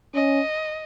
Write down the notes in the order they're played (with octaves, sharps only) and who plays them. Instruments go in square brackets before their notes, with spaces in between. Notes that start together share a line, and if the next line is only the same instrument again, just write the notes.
[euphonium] C#4 [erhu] D#5